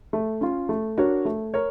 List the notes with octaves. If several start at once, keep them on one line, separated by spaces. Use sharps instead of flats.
A3
C#4 F4
A3
D4 F#4 A#4 C#5
A3
A#4 C#5